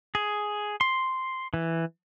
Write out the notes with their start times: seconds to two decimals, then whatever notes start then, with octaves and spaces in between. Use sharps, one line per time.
0.15 G#4
0.81 C6
1.54 E3